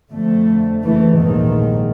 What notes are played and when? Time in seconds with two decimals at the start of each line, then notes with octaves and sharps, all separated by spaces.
0.11 F2 D3 A3
0.83 F#1 E3 A3
1.18 A#1 D#2 G#2 D#3